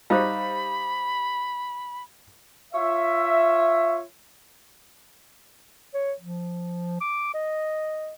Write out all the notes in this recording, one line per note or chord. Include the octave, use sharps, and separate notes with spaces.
G3 D#4 G4 C5 F5 B5
F4 C#5 E5
C#5
F3
D6
D#5